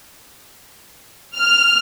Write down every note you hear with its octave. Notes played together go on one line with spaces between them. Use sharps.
F6